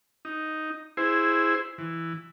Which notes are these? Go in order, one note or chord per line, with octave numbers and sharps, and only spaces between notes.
D#4
E4 G#4 C5
E3